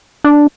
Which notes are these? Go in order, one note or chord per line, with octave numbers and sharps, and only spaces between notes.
D4